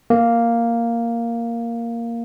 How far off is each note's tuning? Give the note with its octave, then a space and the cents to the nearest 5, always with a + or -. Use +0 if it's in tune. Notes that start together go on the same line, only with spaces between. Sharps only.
A#3 +0